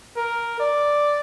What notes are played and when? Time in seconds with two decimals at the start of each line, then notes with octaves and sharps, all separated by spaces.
0.16 A#4
0.60 D5